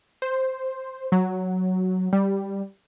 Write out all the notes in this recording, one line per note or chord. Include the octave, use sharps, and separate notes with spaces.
C5
F#3
G3